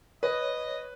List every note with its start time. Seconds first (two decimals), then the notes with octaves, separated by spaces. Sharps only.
0.23 B4 C#5 D#5